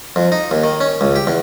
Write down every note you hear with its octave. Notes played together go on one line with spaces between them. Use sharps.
F2
D#4
D#2
D#3
C#4
C#2
G4
E2